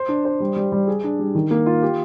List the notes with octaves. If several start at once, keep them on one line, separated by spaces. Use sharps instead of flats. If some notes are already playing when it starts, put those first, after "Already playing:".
Already playing: C5
D4
C5
G3
G3
G3
G#4
D4
G3
D#3
A#3
F4
G4